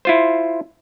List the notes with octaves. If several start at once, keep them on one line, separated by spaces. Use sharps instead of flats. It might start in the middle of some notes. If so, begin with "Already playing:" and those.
E4 F4 C5